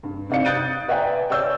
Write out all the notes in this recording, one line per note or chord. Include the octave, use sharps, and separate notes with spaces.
G2
C3 D#4 D5 F5 C#7
D#6 F#6 G6 A6 D7 D#7
B4 D5 E5 G5 G#5 A#5
C#5 D5 E6 G6